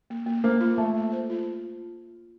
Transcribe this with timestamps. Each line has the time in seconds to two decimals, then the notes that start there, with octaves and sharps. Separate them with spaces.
0.10 A#3
0.26 A#3
0.44 A#3 C5
0.60 F4
0.78 A3 A#3
0.95 A#3
1.12 C5
1.30 F4